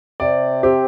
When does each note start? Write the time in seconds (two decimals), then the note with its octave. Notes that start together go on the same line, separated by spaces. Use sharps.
0.20 C3 D5
0.63 C4 G4